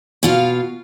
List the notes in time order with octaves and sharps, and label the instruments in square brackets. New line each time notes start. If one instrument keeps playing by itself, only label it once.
[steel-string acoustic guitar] B2 F4 F5